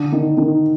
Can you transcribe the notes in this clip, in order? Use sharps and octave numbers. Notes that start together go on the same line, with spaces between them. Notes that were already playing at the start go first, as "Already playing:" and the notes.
Already playing: D3
D#3
D#3